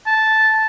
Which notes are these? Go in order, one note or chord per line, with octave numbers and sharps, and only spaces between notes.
A5